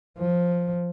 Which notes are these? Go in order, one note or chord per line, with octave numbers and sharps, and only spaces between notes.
F3